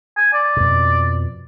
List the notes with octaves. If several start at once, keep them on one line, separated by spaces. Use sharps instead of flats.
G#5
D5
F2 B2